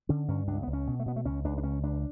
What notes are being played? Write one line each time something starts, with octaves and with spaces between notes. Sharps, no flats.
D3 C#4
G2 C#4
C#2 D4
C#2 B3
C#4
B2
A3
B2 B3
A3
C#2 C#4
C#2 D4
D4
C#2 C#4
C#2 D4